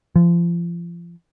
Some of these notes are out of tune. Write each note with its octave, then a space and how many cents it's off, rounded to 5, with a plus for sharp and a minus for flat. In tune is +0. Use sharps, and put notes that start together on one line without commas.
F3 -30